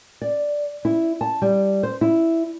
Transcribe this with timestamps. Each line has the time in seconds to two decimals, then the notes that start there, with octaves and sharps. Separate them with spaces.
0.22 D5
0.85 E4
1.21 A5
1.42 G3
1.83 C5
2.01 E4